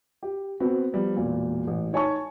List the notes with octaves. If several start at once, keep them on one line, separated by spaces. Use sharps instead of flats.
G4
B3 C4 F#4
F3 G3 B3
E1 A#2
A1
D#4 C#5 G#5 A5 C#6